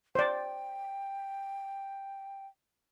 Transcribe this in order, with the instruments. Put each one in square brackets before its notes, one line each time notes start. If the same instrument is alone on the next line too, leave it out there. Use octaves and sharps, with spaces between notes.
[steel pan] C5 D5 [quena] G5